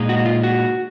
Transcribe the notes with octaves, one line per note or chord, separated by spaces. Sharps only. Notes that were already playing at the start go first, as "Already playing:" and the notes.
Already playing: A#2 G#3 D#4
F#4
F4
F#4